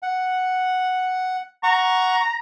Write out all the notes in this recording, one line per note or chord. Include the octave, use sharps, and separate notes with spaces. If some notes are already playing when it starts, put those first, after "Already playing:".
F#5
F#5 A#5 C#6